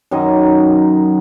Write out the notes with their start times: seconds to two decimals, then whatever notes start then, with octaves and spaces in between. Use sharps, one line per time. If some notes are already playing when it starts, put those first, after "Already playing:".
0.11 F#2 D#3 F#3 D#5